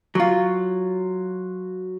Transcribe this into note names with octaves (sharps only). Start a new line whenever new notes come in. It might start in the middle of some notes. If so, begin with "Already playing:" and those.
F#3 F4